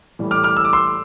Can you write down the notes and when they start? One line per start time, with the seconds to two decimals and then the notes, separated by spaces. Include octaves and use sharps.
0.19 A2 E3 G3
0.31 D6 F6
0.43 D6 F6
0.57 E6
0.65 D6
0.73 C6 E6